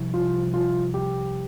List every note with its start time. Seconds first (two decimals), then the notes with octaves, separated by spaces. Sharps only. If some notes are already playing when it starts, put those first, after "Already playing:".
Already playing: C2 C3 F3
0.14 F4
0.54 F4
0.94 G4